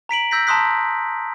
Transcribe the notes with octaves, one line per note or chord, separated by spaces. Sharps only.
A#5 B6 D7 F#7
E6 G6 A#6 B6
A5 A#5 C6 D#6 F#6 B6